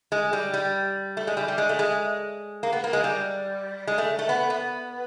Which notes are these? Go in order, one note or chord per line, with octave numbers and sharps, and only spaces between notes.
G#3
G3
G3
A3
G#3
G3
G3
G#3
A3
G#3
A#3
B3
A#3
G#3
G3
G#3
A3
A3
B3
B3